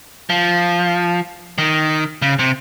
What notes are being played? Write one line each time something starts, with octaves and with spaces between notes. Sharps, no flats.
F3
D#3
C#3
C3